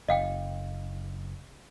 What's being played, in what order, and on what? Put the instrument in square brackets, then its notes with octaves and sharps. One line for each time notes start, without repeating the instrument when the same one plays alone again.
[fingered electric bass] F#1 [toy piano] D#5 F5 G5